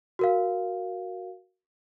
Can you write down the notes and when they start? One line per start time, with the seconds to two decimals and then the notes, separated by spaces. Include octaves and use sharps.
0.19 F#4 A#4 F5